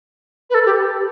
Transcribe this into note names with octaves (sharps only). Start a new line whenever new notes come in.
B4
A4
G4